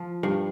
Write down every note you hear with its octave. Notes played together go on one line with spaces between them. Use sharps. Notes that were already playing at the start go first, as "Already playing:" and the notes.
Already playing: F3
G2